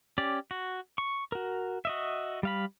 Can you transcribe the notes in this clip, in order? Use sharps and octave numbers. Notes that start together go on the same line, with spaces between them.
C#4 G4 D5
F#4
C#6
F#4 A#4
F#4 D#5 E5
G3 F5 B5